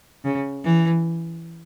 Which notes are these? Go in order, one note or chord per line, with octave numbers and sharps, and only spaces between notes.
C#3
E3